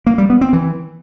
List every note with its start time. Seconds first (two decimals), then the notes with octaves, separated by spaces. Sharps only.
0.07 A#3
0.18 G3
0.30 B3
0.41 C4
0.53 E3